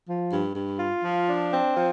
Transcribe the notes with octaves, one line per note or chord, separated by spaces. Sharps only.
F3
G2
G2
F4
F3
D4
C4
F3